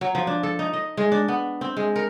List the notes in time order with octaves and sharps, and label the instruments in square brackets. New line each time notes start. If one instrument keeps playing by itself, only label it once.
[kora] F#3
F3
D4
A4
D#4
D#5
G#3
D4
B3
C4
G#3
A#4